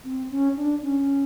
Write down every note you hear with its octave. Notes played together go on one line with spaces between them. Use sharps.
C4
C#4
D4
C#4